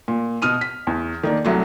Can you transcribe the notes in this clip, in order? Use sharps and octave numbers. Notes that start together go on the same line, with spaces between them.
A#2
B2 D#6 F6 D#7
B6
E2
D#3 A#3 D4
C2 F#3 A3